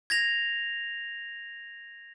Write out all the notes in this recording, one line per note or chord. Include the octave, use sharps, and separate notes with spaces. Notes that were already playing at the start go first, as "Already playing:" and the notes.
G#6 A#6 F7